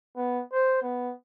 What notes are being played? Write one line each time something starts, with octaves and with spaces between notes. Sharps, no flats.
B3
C5
B3